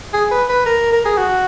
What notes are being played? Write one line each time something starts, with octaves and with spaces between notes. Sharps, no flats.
G#4
B4
B4
A#4
A#4
G#4
F#4